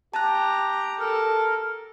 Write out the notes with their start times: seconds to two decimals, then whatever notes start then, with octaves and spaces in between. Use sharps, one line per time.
0.14 G4 A5 A#5 F#6
0.99 A4 A#4